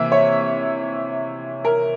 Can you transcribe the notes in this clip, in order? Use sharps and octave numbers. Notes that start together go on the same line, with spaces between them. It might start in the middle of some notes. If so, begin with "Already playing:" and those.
Already playing: C3 E3 A#3 E5
C#5
A#4